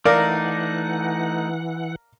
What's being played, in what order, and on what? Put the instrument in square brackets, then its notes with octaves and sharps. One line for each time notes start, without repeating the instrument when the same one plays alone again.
[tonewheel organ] E3 F#5 [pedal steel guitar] A3 D#4 [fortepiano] A#4 D5 F5